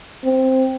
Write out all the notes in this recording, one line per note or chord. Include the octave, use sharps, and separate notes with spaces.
C4